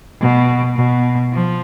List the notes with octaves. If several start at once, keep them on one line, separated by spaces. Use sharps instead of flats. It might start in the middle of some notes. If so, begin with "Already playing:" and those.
B2
B2
F3